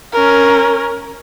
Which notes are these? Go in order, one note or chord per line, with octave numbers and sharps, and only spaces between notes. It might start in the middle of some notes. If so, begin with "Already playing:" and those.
C#4 A#4